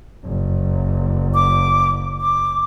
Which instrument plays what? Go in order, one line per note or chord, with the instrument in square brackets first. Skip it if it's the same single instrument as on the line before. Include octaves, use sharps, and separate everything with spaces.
[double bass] F#1
[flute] D6
D6